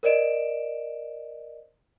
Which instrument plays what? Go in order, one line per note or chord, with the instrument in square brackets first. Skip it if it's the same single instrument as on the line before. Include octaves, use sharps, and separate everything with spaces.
[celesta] A#4 C5 D5 D#5 D7 E7